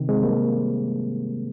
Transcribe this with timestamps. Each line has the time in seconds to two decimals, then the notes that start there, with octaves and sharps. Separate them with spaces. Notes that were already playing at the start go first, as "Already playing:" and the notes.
Already playing: C3 D#3
0.09 G#3 C4
0.23 G3 A#3